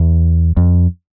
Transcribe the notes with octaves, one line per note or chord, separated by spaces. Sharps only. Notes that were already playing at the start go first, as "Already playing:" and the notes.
Already playing: E2
F2